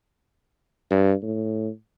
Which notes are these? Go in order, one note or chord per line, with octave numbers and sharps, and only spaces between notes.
G2
A2